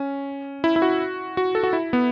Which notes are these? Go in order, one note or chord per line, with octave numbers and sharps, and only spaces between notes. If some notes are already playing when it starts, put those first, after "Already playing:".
Already playing: C#4
E4
E4
F#4
F#4
A4
F#4
E4
B3